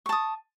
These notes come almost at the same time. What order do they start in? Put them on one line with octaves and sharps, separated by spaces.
C#6 A5 D#6